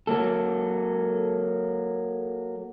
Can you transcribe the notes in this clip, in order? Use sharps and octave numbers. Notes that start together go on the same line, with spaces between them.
F#3 A#3 A4